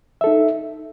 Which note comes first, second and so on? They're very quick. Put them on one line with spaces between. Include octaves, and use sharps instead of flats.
E5 A4 D#4